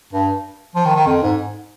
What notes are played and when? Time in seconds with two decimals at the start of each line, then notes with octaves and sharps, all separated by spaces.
0.13 G2
0.75 F3
0.85 D#3
0.96 D#3
1.07 F2
1.22 G#2